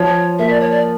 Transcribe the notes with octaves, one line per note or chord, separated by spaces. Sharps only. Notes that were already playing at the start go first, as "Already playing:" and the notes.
Already playing: F3 C#5
A#3 E5
D5
C#5
D5